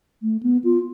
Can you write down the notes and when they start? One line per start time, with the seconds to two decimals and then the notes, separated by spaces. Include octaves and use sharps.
0.22 A3
0.43 B3
0.64 F4